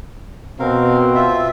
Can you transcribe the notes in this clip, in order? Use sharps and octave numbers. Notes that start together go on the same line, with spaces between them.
B2 C4 A#4 F5
F4 E5